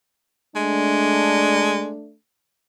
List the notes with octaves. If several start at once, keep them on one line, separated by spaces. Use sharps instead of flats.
G#3 A3 D4